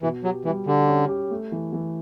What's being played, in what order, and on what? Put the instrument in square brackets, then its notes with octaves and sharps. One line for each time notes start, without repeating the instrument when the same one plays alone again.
[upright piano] B2 [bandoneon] E3
[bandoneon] F#3 [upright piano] G4
[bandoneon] E3 [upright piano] G3
[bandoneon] D3 [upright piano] G4
[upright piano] C#4
G4
A3
E3
E3